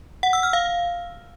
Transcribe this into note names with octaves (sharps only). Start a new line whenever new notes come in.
F#5
E6
F6
F5